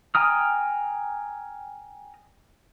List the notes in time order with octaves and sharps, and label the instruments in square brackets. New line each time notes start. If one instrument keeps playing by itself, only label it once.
[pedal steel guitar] G5 G#5 A#5 D#6 F6